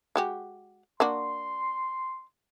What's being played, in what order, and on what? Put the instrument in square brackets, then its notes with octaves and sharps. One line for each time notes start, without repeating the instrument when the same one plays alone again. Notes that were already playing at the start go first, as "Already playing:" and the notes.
[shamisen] G#3 F#4 G4
[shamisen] A#3 D4 F#4 [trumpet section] C6